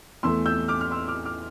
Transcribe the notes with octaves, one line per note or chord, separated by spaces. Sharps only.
E2 E3 A3 C6 E6
E6 G6
D6 F6
F6
C6 E6
D6 F6
D6 F6